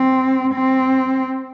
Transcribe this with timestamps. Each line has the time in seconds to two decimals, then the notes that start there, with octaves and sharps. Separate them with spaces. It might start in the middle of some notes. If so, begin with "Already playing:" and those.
Already playing: C4
0.54 C4